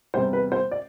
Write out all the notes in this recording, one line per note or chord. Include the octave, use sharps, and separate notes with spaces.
E2 C3 G3 C5
B4
C5
D5